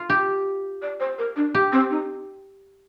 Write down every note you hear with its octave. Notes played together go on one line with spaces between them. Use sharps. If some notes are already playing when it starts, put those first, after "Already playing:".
Already playing: F4
G4
D5
C5
A#4
D4
G4
C4
D#4